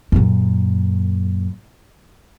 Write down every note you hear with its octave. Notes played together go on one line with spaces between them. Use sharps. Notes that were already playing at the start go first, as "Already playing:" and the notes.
F#2 A#2